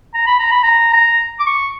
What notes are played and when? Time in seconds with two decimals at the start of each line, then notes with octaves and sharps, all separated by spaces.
0.15 A#5
0.27 B5
0.39 A#5
0.51 B5
0.63 A#5
0.94 A#5
1.40 D6
1.47 C#6